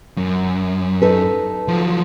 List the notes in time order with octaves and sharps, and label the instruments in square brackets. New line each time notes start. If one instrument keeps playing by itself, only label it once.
[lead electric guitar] F#2
[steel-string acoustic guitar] D#4 A4 B4
[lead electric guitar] F3 F#3